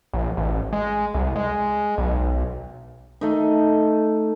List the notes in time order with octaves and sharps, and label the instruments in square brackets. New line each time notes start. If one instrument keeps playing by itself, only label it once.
[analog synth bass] A#1
A1
G#3
C2
G#3
B1
[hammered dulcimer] A3 D#4